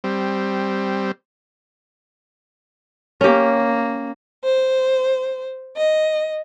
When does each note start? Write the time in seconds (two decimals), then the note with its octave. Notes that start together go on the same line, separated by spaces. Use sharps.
0.04 G3 C4
3.21 A#3 C#4 G4
4.44 C5
5.77 D#5